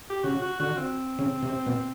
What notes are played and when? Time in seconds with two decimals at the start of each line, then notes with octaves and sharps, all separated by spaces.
0.10 G4
0.24 C#3 F#4
0.42 F#4
0.60 D3 F#4
0.77 C4
1.19 C#3
1.43 C3
1.66 B2